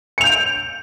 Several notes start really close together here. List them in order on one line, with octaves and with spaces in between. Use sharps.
C#7 F7 G6 D7